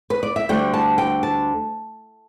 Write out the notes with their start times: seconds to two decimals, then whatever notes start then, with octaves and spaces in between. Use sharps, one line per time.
0.10 B4
0.23 D5
0.36 E5
0.49 D2 D3 G3 G5
0.74 A5
0.98 G5
1.23 A5